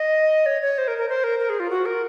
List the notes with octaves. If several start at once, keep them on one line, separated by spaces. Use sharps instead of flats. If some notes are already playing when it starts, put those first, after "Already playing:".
Already playing: D#5
C#5
C#5
C5
A#4
A#4
C5
A#4
A#4
G#4
F4
F#4
A#4